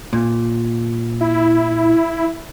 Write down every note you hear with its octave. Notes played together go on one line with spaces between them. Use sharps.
A#2
E4